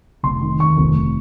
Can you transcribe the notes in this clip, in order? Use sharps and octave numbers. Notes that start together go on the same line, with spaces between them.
F1 C6
D#3
D#2 C#6
F1
F1